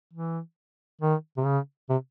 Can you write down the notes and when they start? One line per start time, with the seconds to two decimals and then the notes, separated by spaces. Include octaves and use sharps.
0.13 E3
1.01 D#3
1.37 C3
1.45 C#3
1.90 C3